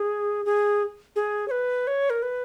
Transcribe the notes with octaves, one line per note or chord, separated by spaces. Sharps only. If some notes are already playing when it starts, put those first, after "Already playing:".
Already playing: G#4
G#4
G#4
C#5
B4
C#5
A#4
B4